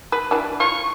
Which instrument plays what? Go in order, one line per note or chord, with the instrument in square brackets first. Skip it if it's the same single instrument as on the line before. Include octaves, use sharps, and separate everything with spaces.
[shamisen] B4
E3 D4
[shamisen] F4 [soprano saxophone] C#6